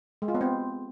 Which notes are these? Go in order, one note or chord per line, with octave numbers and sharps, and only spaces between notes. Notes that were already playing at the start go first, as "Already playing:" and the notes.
G#3
F4
B3
C4